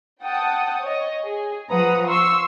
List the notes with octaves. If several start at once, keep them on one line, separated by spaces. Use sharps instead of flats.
F#5 G5 A5 D#6
C#5 D#5
G#4
F3 B4 F#5 A#5 D#6
F5 C6 C#6 E6